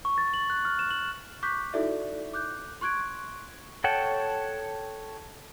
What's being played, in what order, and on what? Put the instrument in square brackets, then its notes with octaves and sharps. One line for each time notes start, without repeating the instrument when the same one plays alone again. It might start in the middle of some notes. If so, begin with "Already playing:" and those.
[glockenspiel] C#6
A6
F#7
F#6
F6
E7
F#7
[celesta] C#6 D6 F#6 G6 B6
D#4 E4 F#4 A4 D5 E5
D6 F#6 G6
C6 C#6 F#6 G#6 D7
[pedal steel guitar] A4 C#5 F#5 G5 A5